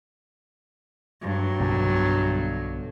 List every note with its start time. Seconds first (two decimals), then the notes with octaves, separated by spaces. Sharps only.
1.22 G2 F#3
1.60 B1 B2 D3